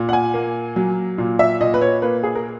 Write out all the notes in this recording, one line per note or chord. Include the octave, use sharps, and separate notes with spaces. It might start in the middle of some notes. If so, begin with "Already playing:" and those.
Already playing: A#2
F#5
G#5
A#3
F#3
A#2
E5
A#2 D#5
B4
C#5
A#3 B4
G#4
A#4